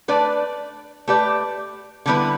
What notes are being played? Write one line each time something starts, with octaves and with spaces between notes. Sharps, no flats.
A3 D4 B4 D5
A3 G4 B4 D5
D3 G3 B3 E4 B4